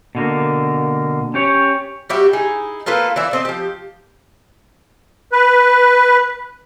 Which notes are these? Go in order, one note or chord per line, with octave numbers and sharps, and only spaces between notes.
B2 D3 A#3
C#4 G4 C#5
G3 F#4 G4 E5
D#4 E4 G#4
A#3 F4 A4 B4
E3 D5 E5
A3 C4 D#5
F3 G4
B4